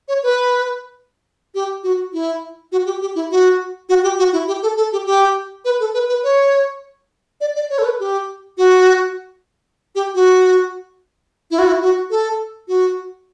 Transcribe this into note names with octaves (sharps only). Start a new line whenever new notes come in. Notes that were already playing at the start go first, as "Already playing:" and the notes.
C#5
B4
G4
F#4
E4
F#4
G4
G4
E4
F#4
F#4
G4
F#4
E4
G4
A4
A4
G4
G4
B4
A4
B4
B4
C#5
D5
D5
C#5
A4
B4
G4
F#4
G4
F#4
E4
F#4
E4
F#4
A4
F#4